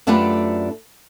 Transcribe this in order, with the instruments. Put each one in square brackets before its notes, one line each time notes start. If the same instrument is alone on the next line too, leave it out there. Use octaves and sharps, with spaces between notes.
[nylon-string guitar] F#2 A3 D4 F4 G4 B4